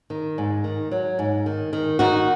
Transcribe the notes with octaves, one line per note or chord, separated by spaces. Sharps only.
D#3
G#2
D#3
F#3
G#2
D#3
D#3
D#3 D#4 F#4